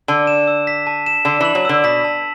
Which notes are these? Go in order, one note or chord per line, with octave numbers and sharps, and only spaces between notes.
D3 A5
E7
E6
B6
A5
E7
D3 A5
E3 F#7
F#3
D3 E6
B2 B6
A5